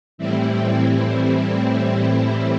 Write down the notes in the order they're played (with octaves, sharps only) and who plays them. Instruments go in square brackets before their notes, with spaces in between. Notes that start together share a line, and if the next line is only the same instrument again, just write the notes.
[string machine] A2 E3 G3 C4 E4